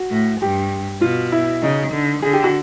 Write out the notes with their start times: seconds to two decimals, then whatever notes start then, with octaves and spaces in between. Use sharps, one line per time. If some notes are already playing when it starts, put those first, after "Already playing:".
Already playing: F#4
0.10 A2
0.41 G2 G4
1.01 B2 F4
1.32 E4
1.62 C#3 D#4
1.93 D3
2.22 D3 G#4
2.33 G4
2.44 F#4